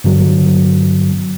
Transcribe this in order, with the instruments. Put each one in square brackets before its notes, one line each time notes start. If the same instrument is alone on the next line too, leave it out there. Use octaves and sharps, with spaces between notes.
[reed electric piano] G2 D3 F#3